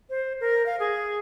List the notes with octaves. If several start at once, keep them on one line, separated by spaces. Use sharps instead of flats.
C5
A#4
F5
G#4